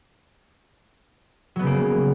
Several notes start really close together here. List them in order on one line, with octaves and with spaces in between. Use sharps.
F#3 B3 C#3 A#3